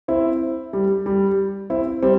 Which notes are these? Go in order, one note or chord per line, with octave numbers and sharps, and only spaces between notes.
C4 E4
G3
G3
C4 E4
G3 C4